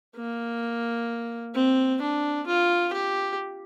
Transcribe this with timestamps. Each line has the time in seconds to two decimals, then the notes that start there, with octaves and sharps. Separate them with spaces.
0.17 A#3
1.55 C4
2.02 D4
2.47 F4
2.93 G4